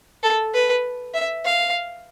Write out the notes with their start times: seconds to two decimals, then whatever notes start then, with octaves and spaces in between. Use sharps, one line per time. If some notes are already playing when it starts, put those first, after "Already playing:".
0.23 A4
0.54 B4
1.14 E5
1.45 F5